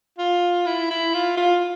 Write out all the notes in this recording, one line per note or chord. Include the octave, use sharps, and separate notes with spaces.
F4
E4
E4
F4
F4